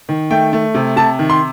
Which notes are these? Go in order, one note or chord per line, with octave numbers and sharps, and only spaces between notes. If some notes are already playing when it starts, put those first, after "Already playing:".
D#3
A3 G5
A3
C3
C3 A5
D#3
C6